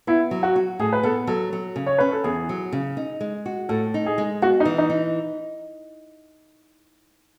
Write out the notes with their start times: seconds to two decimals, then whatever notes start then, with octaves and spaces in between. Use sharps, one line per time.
0.07 B3 E4
0.31 F#3
0.43 F#4
0.56 F#4
0.79 A2 G#4
0.93 B4
1.03 B3 A4
1.27 F#3 A4
1.53 F#3
1.76 C#3
1.86 C#5
1.98 C#4 B4
2.12 A4
2.24 E2 G#4
2.49 F#3
2.72 C#3
2.97 D#4
3.21 G#3
3.46 F#4
3.69 A2 A4
3.94 D#4
4.06 G#4
4.18 G#3
4.42 B3 F#4
4.60 D#4
4.65 E3
4.78 D#4
4.90 D#4